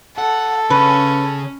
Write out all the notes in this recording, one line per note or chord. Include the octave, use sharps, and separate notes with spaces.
A4 F#5
C#3 C#4 B4